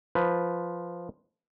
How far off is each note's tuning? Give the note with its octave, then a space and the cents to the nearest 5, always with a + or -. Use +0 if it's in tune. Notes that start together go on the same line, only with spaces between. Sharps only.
F3 +0 B4 +0